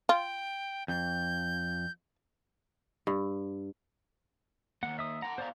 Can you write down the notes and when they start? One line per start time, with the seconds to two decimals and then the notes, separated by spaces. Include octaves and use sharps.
0.09 F4 G5
0.88 F2 G6
3.07 G2
4.83 D#3 A#3 F#5
4.99 E5 D#6
5.22 F#5 A5 A#5
5.38 B2 C5 D5 F5 A#5